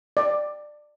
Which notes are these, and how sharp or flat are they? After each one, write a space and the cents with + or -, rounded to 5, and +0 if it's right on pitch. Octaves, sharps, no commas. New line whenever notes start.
D5 +15